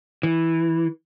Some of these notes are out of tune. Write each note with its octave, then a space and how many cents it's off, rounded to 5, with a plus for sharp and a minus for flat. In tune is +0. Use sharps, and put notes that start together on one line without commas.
E3 -5